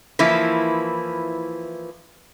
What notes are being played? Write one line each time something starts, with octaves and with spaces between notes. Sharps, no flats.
E3 F3 A#3 E4